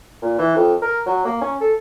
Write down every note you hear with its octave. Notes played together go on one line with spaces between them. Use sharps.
A#2
E3
F2
A#4
F#3
A#3
C#4
A4